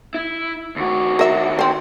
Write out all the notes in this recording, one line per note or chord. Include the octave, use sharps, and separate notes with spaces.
E4
D#2 F#4
A#4 E5
C4 C5